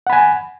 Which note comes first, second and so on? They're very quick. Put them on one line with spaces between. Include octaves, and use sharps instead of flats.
F#5 B5 G#5